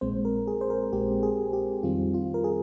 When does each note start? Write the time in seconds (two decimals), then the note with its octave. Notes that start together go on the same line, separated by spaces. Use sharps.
0.01 A#1 A#2 G#3 C4 C5
0.25 A#4
0.47 G#4
0.61 C5
0.70 A#4
0.93 A#1 A#2 G#3 C4 G4
1.23 G#4
1.53 G4
1.83 F2 D#3 G3 C4 F4
2.14 F4
2.34 A#4
2.44 G#4